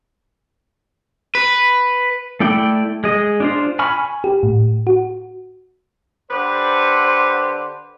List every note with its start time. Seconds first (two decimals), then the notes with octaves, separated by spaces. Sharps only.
1.35 B4
2.40 A3 E4 D5 G5
3.04 G#3 D#5
3.40 D4 F4 C5
3.79 G#5 B5 C#6 F6
4.24 G4
4.43 A2
4.87 F#4
6.30 D3 G4 B4 C5